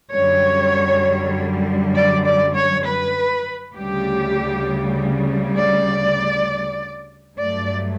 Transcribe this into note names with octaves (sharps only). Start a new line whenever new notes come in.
F#2 D3 G3 C#5
D5
D5
C#5
B4
D2 C#3 G3 G4
D5
G2 F#3 A3 D5